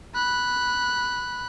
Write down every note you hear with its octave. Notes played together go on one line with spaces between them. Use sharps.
B5 F#6